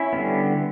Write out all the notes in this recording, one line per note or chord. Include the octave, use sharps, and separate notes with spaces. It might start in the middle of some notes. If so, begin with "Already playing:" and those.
Already playing: C#4 E4
D3 G3 B3